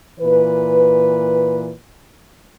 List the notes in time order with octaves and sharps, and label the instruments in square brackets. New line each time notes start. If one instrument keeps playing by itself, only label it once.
[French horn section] A#2 E3 B4